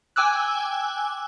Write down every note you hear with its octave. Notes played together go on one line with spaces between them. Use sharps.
G5 G#5 D6 E6 F#6